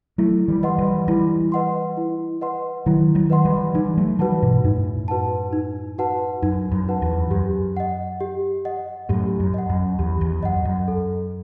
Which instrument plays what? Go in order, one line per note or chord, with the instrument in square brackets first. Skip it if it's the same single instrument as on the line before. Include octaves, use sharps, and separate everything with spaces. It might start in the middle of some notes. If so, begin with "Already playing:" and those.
[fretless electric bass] F#3 A3 [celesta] E4
[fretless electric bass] E3 G3
[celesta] B4 D#5 F#5 C6
[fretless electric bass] E3 G3
[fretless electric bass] E3 G3 [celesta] E4
[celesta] B4 D#5 F#5 C6
E4
B4 D#5 F#5 C6
[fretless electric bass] D#3 F#3 [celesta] E4
[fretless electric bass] D#3 F#3
[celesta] B4 D#5 F#5 C6
[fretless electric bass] E3 G3
[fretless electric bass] E3 G3 [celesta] D#4
[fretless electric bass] F#3 A3
[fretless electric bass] E3 G3 [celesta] F#4 B4 F#5 A5
[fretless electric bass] G2 B2
[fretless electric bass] F#2 A2 [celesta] D#4
[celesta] F#4 B4 F#5 A5
D#4
F#4 B4 F#5 A5
[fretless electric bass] F#2 [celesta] D#4
[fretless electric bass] F#2
[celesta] F#4 B4 F#5 A5
[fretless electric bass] E2
[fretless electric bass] F#2 [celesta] G4
[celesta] D#5 F#5
G4
D#5 F#5
[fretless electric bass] F#2 A2 [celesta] G4
[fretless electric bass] F#2
[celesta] D#5 F#5
[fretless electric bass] F#2
[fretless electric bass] E2 [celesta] G4
[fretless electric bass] E2
[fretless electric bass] F#2 [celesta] D#5 F#5
[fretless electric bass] F#2
[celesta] A4